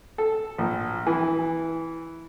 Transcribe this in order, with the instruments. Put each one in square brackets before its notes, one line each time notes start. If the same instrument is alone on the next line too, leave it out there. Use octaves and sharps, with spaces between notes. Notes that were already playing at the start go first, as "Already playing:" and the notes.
[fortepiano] A4
A#1
E3